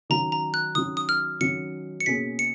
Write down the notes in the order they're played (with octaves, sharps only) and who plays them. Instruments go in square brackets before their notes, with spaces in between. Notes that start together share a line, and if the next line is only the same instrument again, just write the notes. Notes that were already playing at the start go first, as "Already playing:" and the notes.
[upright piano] D#3 F#3 C#4 [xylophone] A#5
[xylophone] A#5
F#6
[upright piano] D#3 F#3 C#4 [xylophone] D#6
[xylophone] D#6
F6
[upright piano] D#3 F#3 C#4 [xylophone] C#7
[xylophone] C#7
[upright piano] B2 A#3 C#4 G#4 [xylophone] B6
[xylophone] C#7